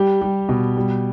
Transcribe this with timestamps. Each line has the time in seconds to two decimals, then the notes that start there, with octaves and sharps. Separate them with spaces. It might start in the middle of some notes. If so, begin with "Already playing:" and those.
Already playing: G3 G4
0.21 G3
0.49 B2
0.77 G3